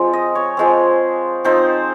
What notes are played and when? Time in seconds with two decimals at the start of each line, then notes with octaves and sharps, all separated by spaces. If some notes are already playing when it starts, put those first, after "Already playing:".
Already playing: F3 G#3 C4
0.13 D#5
0.35 C#5
0.57 F3 G#3 C4
1.44 F3 C4 D#4 C5